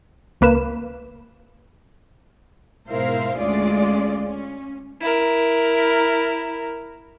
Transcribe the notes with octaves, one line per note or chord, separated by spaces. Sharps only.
C#2 A#3 B4 E7
G#2 B2 E4 A#4 C5 F5
D2 G#3 C#4 F4 G#4 D5
C#4
E4 A#4